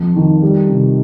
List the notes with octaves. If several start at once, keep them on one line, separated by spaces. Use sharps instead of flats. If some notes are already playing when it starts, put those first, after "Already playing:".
Already playing: F2 F3
D#3
G3
C3